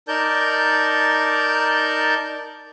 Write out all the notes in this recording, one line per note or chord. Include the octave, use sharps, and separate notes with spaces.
D#4 A#4 D5 A5 G6